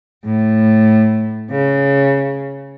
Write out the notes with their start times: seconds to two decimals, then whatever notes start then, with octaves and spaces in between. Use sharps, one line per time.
0.25 A2
1.51 C#3